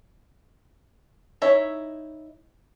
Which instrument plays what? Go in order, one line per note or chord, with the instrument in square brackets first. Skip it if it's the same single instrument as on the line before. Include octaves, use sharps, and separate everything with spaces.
[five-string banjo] D#4 E4 C#5 E5